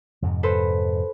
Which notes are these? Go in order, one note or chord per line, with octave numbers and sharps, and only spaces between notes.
F2 G#2 C3
A4 B4 C5